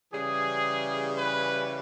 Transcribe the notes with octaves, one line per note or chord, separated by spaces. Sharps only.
C#3 E3 G3 G#4
B4